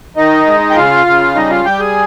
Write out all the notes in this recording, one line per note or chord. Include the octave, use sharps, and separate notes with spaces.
D#3 D#4 D#5
G#3
G5
C#3 F4 F5
C#3
G3 D#4 D#5
F4 F5
G3 G4 G5
G#4 G#5